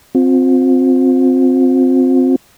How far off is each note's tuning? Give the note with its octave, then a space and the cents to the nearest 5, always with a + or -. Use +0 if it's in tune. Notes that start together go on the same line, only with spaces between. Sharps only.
C4 +0 F4 +40